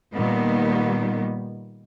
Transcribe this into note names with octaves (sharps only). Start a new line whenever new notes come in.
A#2 D#3 G3 B3